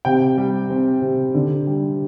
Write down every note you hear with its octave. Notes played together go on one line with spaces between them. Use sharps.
C3 G5
G3
C4
C3
D3
G3